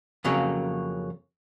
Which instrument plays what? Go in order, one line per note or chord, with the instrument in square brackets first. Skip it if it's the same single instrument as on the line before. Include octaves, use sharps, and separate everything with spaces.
[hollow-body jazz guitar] F2 C#3 F#3 A#3